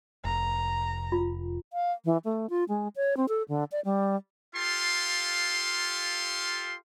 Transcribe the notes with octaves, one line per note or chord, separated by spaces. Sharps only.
F1 A#5
F4
F5
E3
A3
F4
G#3
C#5
C4
A4
D3
D5
G3
F4 G4 A4 F5 C6